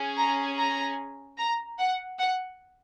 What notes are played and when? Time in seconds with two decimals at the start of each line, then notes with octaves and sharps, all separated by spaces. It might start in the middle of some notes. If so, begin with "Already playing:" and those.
Already playing: C#4 G#4
0.17 A#5
0.57 A#5
1.37 A#5
1.78 F#5
2.18 F#5